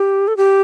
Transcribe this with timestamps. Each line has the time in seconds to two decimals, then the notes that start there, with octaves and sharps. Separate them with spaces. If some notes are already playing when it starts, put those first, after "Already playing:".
Already playing: G4
0.28 A4
0.37 G4